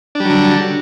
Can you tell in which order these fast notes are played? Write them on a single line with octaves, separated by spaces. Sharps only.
D4 G3 F#3 D3